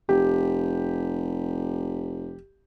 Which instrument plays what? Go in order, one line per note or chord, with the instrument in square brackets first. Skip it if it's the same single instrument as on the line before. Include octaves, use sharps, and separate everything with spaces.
[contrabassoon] F1 [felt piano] G4